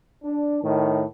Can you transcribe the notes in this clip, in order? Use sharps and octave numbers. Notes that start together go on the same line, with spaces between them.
D4
A2 D#3